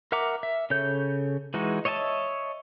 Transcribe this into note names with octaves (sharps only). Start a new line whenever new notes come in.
A#4 E5 F#5 A#5 D6
E5
C#3 A4 C#5 G6
E3 G#3 D#4 F#4
C#5 D#5 E5 G#5 A5